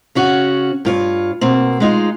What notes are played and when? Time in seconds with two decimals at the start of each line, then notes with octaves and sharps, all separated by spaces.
0.15 C#3 C#4 F#4
0.85 G2 F4 C#5
1.41 B2 A#3 C4
1.80 G#3 D#4 F4